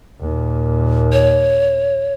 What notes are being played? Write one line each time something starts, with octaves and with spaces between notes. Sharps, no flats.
D#2 A#2
C#5